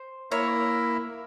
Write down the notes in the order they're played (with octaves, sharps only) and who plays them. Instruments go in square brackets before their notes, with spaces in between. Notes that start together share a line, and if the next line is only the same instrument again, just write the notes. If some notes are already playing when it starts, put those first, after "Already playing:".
Already playing: [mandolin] C5
[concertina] A#3 E4 A#4 E5 [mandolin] C#5